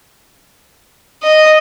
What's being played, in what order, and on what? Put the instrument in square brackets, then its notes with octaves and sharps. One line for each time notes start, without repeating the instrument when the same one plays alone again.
[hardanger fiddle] D#5